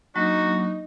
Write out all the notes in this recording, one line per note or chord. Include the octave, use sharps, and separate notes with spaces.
F#3 A#3 D4 D#4 F#4